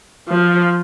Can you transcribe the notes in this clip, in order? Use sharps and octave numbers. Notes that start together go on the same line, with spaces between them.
F3